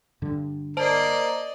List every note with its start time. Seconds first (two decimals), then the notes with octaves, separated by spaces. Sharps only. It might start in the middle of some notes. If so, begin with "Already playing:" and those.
0.22 G2 D3
0.77 A#3 C5 D5 D#5 A5